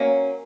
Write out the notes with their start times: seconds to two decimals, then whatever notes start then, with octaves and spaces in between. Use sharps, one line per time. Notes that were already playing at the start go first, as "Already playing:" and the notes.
Already playing: F#3 A#3 C#4